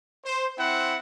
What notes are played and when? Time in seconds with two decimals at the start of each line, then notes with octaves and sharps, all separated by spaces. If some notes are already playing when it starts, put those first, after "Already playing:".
0.25 C5
0.59 C4 E4 F#5